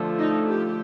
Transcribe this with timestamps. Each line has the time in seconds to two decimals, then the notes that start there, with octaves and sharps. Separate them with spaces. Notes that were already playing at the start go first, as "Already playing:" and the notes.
Already playing: D3 F3 A3
0.18 D#4
0.47 G4